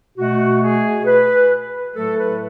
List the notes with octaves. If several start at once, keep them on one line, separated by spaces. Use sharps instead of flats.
B2 A3 F#4
G#4
B4
A2 F#3 A3 A4
B4